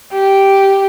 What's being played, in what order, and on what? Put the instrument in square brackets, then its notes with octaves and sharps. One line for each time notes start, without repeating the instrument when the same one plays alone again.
[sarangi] G4